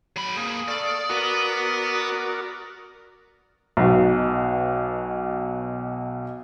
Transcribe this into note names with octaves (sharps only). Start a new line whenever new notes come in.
F#3 B5
A#3 G#4 D#6
A4 D5 F5 C#6
B3 F#4 A#4 D5
B1 B2